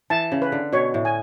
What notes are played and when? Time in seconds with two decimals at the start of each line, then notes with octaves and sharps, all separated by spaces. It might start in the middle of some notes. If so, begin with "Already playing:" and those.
0.10 E3 A5
0.32 C#3
0.42 B4
0.52 D3
0.73 B2 C#5
0.94 A2
1.05 G#5